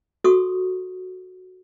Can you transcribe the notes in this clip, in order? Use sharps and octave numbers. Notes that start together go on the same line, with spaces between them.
F#4 A4 C#6 D#6